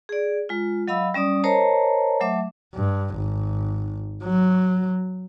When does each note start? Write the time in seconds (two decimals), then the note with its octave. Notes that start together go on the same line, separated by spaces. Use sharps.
0.09 G#4 D5
0.49 G#3 F4
0.88 F#3 D#5 F5 B5 E6
1.14 G3 C#4 D5 D#6
1.44 A#4 C5 C#5 D#5 A5 A#5
2.20 F#3 A3 E5 D6
2.75 G2
3.17 G#1
4.23 F#3